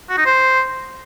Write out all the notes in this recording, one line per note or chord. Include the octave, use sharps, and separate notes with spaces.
F#4
D#4
C5